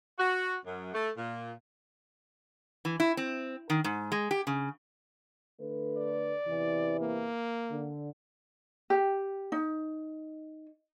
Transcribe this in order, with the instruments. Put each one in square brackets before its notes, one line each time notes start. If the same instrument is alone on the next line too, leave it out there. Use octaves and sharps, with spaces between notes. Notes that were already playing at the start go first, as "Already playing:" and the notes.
[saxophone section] F#4
F#2
A3
A#2
[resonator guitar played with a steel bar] E3
E4
C4
D#3
G#2
G#3
G4
C#3
[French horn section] D3 A3 B4
[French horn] D5
[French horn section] E2 C3 E3
[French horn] A#3
[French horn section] D3
[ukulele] G4
D#4